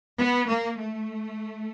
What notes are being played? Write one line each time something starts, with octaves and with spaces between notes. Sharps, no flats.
B3
A#3
A3